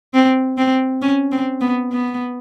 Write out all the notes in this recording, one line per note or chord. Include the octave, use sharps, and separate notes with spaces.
C4
C4
C#4
C4
B3
B3